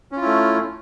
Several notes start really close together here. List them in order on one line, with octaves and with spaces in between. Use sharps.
C#4 F4 E4 A3